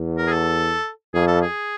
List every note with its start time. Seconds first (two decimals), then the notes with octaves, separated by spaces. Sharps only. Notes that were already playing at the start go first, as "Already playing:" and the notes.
Already playing: E2
0.17 A#4
0.27 G#4
0.31 A4
1.14 F2 G#4
1.27 A4
1.42 G#4